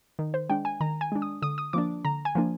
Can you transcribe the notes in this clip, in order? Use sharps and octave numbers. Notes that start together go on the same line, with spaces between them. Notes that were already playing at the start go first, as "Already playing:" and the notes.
D#3
C5
G#3 D4 G5
G#5
D#3 A#5
G#5
G#3 D4
D#6
D3 D#6
D#6
F3 A#3 D4 D6
D3 A#5
G#5
F3 A#3 D4